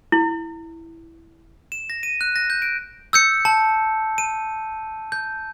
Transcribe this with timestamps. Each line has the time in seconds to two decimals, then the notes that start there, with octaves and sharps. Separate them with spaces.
0.12 E4
1.72 E7
1.90 A#6
2.03 D#7
2.21 F#6
2.36 A#6
2.50 G6
2.62 D7
3.13 E6 G6 C#7
3.45 A5
4.18 D#7
5.12 G6